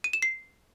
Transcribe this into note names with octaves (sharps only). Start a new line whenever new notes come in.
D#7
E7
C7